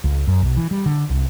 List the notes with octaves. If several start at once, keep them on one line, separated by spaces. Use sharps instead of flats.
C#2
F#2
B1
E3
G3
D3
C2